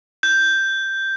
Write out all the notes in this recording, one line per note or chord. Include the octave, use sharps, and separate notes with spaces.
G6